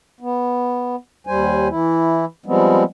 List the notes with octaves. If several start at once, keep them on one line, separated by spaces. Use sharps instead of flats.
B3
D#2 G3 C5 G#5
E3 E4
F3 G3 G#3 B3 C4